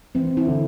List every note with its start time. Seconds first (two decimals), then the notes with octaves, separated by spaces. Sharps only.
0.15 E3 C4
0.37 E4
0.47 D3